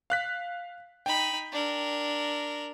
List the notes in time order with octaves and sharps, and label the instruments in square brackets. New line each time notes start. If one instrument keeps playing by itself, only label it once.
[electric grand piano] F5 F#6 B6
[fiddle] D#4 B5 [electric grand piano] G5
[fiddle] D4 A#4